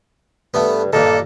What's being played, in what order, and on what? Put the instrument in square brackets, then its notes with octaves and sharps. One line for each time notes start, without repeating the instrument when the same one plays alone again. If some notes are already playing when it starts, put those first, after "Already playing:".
[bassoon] G2 [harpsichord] A3 B3
[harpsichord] G2 A#2 D#3 [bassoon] A4